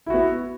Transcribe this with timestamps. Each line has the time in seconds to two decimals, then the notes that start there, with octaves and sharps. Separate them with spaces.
0.06 E4
0.10 F#4
0.14 B3